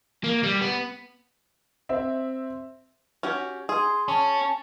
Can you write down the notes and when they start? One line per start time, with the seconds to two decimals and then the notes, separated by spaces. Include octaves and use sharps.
0.24 A#3
0.43 G3
0.61 B3
1.89 C4 E5
3.23 C#4 F#4 G4
3.69 G#4 C6
4.08 C#4 A5